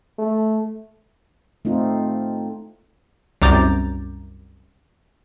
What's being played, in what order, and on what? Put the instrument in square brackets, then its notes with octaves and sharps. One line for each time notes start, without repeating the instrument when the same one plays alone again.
[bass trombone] A3
[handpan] A3 C4 D#4 F4
[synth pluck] C2 F#2 A#5 D6 G6 A6